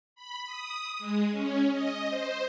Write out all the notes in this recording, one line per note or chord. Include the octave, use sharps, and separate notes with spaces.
B5
D#6
G#3
C#4
D#5
C5